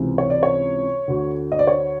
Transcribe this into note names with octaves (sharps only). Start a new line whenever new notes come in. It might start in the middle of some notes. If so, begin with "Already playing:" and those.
Already playing: C#2 C3 E3
C#5
D5
C#5
D2 D3
D#5
D5
C#5